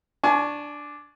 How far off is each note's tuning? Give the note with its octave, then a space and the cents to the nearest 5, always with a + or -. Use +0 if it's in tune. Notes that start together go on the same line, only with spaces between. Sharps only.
D4 +0 G#5 +30 C#6 +0